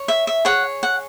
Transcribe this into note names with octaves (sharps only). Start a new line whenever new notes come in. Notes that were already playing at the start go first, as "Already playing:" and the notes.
Already playing: C#5
E5
E5
G#4 C#5 F#5
F#5